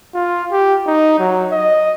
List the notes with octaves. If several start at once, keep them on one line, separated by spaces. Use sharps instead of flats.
F4
G4
D#4
F#3
D#5